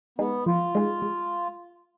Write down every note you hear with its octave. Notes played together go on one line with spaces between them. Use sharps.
G#3 B3 D#4 G#4
F3 F4
G#3 D#4 G#4
G#3